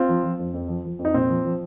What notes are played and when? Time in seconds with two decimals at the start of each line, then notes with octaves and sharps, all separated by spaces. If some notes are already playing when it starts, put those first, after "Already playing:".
Already playing: C4 F4
0.09 F3
0.24 F3
0.39 F2
0.54 F2
0.68 F3
0.85 F3
0.99 F2
1.05 D#4
1.14 A#2 C4
1.30 F3
1.45 F3